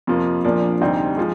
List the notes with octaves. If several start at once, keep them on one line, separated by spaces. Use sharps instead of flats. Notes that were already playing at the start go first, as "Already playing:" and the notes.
F2 C3 F3 A#3
A#1 A#2 F3 A#3 D4
D2 C3 G3 C4 D#4
F3 G#3